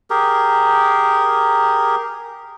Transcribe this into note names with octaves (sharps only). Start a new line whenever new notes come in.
G4 G#4 A#4